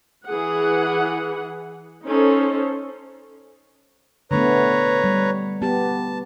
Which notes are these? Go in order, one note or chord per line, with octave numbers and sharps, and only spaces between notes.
E3 G#4 F#5
C#4 D#4 A4 C5
D3 A3 B3 B4 C#5 A#5
G3
B3 G4 A5